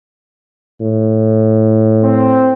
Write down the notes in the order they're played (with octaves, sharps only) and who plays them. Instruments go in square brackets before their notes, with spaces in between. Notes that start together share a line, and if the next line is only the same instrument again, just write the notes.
[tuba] A2
[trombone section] C4